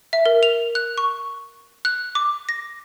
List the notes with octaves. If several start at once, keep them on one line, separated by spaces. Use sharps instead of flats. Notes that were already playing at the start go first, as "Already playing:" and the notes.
E5
A#4
F7
F#6
C#6
F#6
D6
A#6